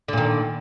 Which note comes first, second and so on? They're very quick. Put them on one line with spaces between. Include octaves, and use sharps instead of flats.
D3 A#2 D#3